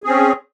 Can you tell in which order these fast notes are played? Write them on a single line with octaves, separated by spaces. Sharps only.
G#4 C4 C#4